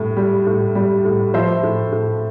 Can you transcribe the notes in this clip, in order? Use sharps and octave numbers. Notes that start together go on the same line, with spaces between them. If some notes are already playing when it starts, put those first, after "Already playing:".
Already playing: A2 G3
G3
A2
G3
A2
F3 C5 E5
A2
A2